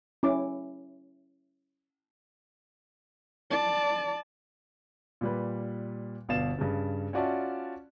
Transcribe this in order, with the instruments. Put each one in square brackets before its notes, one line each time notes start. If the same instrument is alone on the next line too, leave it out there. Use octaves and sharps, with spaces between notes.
[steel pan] C#4 E4 D6
[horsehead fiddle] D5 A5
[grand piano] A#2 G3 B4
G1 B2 D5 F5 A6 E7
G2 C#3
C#4 F4 F#4 D5 E5 A5